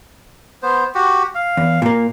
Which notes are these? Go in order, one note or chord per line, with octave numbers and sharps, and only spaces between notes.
B3 C5
F#4 G4
F5
E2
A#2 A#3